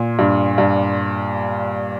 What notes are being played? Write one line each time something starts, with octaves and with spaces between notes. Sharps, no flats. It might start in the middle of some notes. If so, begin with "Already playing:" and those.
Already playing: A#2
G2
G2